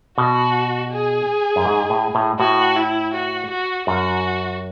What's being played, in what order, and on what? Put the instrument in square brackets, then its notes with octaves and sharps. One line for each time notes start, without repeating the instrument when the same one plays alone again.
[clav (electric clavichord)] B2 [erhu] F#4
[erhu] G#4
[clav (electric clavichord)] F#2
G#2
A2
A2
[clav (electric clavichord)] A2 [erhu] F#4
[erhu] E4
F#4
F#4
[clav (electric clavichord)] F#2 [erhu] F#4